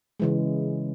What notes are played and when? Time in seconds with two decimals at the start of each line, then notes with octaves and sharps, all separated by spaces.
0.20 C#3 E3 G#3